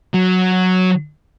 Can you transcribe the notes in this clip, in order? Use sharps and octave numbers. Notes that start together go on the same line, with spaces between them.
F#3